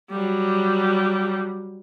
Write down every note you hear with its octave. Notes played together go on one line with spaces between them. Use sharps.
F#3 G3